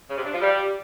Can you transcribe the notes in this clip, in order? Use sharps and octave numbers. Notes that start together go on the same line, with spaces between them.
C#3
C3
D4
F3
G3